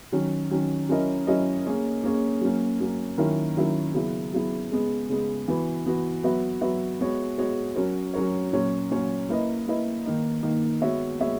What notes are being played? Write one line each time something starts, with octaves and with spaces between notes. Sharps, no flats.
D#3 F#3 C#4
D#3 F#3 C#4
F#3 C#4 E4 A#4 D#5
F#3 C#4 E4 A#4 D#5
A#3 C#4 G#4 C#5
A#3 C#4 G#4 C#5
F#3 A#3 C#4
F#3 A#3 C#4
D#3 F#3 C#4 E4 A#4
D#3 F#3 C#4 E4 A#4
C#3 F#3 B3 E4
C#3 F#3 B3 E4
C#3 G#3 B3
C#3 G#3 B3
E3 B3 F#4 B4
E3 B3 F#4 B4
F#3 B3 F#4 B4 E5
F#3 B3 F#4 B4 E5
G#3 B3 F#4 C#5
G#3 B3 F#4 C#5
F#3 C#4 F#4 A#4 C#5
F#3 C#4 F#4 A#4 C#5
A#2 F#3 C#4 F#4 C#5
A#2 F#3 C#4 F#4 C#5
A#3 E4 B4 D#5
A#3 E4 B4 D#5
D#3 A#3 D#4
D#3 A#3 D#4
G#3 B3 F#4 C#5 E5
G#3 B3 F#4 C#5 E5